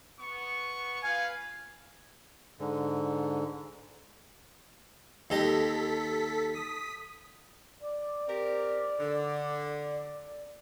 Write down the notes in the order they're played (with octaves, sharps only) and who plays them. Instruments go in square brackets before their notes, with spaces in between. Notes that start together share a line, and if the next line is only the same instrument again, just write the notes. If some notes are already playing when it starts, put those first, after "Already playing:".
[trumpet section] B3 C#6
[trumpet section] F4 B4 F5 [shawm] G#5
[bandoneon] G#2 D3
[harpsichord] D#2 G4 D#5 [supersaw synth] A4 B6
[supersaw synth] D#6 B6
[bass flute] D5
[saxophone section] C4 G4 A#4
D3